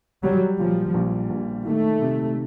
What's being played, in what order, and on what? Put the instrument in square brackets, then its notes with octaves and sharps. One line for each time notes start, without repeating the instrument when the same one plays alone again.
[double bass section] F#3 [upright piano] G3
[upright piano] A#2 [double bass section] F3
[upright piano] A#1
A#1
[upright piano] D#3 [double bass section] A3
[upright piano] C3